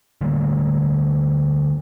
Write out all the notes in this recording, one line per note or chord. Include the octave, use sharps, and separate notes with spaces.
D3 G3 A3 A#3